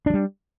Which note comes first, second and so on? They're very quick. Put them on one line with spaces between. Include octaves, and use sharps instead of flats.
D4 F#3 G3